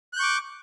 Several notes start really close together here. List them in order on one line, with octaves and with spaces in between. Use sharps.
F#6 G6 C#6 D6